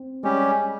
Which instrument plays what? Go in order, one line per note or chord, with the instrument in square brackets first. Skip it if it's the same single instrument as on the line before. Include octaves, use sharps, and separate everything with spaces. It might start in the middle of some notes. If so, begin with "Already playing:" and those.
Already playing: [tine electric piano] C4
[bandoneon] G3 C#4 G4 [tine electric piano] G#3